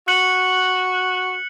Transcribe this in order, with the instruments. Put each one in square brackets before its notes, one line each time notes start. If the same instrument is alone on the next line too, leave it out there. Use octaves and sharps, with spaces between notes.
[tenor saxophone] F#4 [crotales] F#6 C#7 F#7